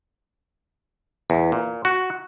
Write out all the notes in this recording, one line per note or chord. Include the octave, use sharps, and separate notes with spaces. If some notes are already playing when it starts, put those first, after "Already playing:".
E2
A#2
F#4